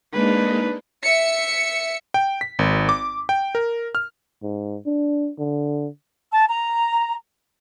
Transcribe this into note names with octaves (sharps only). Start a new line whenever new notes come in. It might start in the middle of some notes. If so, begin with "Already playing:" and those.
G#3 A#3 D4 D#4 B4
E5 C#7
G5
B6
G#1
D6
G5
A#4
F6
G#2
D4
D3
A5
A#5